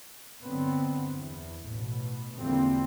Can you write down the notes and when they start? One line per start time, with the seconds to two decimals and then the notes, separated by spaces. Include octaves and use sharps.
0.44 G1 D3 F#3 B3 C4
1.11 E2
1.67 A1 B2
2.38 E2 D3 F3 G3 A#3 C4